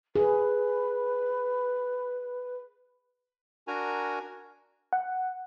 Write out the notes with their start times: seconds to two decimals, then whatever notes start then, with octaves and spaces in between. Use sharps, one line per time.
0.16 G#4 B4
3.68 D4 F#4 A#4 G#5 A#5
4.93 F#5